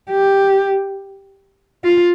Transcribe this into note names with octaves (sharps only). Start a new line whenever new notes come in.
G4
F4